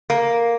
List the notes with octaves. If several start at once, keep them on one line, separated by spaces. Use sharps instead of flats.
A#3